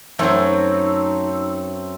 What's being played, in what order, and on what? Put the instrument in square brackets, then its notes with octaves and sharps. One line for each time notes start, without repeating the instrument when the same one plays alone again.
[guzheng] F#2 F#3 [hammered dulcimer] A3 C4 [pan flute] D#4